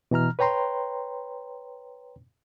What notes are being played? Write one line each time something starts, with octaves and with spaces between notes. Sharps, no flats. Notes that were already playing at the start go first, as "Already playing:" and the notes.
B2 E3 A#5 F6
B4 C#5 G5 A#5 C6